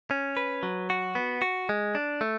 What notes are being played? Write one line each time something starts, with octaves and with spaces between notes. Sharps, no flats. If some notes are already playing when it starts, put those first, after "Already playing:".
C#4
B4
F#3
F#4
B3
F#4
G#3
D4
A3